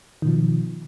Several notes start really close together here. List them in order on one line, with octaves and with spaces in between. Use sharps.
D#3 B2 F3